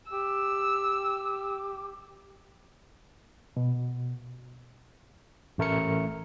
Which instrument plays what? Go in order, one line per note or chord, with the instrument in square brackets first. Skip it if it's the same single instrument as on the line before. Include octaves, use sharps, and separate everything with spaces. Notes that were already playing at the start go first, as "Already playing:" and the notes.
[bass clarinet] G4 [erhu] E6
[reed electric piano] B2
[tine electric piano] A1 A3 A#4 C#7